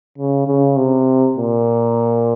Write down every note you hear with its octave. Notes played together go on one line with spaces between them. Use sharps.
C#3
C#3
C3
A#2